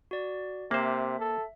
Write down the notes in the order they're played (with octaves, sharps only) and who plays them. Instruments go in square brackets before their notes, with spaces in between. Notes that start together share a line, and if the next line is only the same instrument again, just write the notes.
[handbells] F#4 D5
[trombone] C3 [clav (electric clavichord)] A#3 C5 [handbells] E5
[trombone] A4